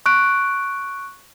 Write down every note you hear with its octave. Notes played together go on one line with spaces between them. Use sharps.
C#6 F#6 D7